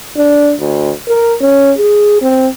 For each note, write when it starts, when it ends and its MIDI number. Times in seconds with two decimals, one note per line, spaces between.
0.16 0.54 62
0.60 0.92 38
1.09 1.36 70
1.41 1.72 61
1.78 2.19 68
2.22 2.48 60